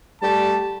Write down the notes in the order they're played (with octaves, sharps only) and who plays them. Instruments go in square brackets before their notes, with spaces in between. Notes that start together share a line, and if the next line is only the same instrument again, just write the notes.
[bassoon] G3 [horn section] A3 G4 A5